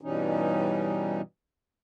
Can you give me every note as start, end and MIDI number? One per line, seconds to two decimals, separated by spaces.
0.01 1.21 43
0.01 1.21 47
0.01 1.21 52
0.01 1.21 55
0.01 1.21 61
0.01 1.21 63